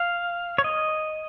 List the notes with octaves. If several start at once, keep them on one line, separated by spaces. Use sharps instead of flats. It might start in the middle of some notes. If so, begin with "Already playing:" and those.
Already playing: F5
C#5
D#5